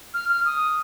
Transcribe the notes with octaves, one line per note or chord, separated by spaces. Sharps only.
F6
F6
D#6